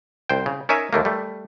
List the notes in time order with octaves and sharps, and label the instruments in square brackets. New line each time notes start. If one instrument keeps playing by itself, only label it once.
[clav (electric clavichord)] C2 C5 G5
C#3
C#4 D#4 A#4 C#5 E5 G#5
D#2 A3 A#3
G3 A3